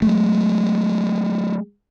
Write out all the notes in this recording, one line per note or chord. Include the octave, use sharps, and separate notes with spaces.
F#3 G#3 A3